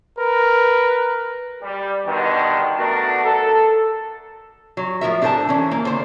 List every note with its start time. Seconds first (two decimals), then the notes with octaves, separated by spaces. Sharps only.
0.19 A#4 B4
1.63 G3
2.06 G2 B2 D3 D#3
2.78 A3 B3 D4 F#4 A#4
3.25 A4
4.77 F#3
5.01 A2 F3 A#4 E5
5.22 D4 G4 A4 A#4 C5 A5
5.49 E3 C#4
5.71 A#3
5.85 D3 C5